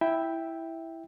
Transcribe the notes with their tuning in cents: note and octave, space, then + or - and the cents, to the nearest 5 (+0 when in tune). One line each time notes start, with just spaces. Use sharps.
E4 +0 E5 -5 G5 +0